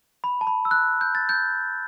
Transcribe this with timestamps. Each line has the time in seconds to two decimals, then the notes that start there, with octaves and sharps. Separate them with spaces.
0.24 B5
0.41 A5
0.47 B5
0.65 E6
0.71 F#6
1.01 G6
1.15 A6
1.29 G6